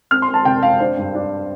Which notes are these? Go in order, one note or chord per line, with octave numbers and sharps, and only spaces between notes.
C4 F6
C6
C4
A5
C3 G5
C4 F5
D4 C5
G2
D4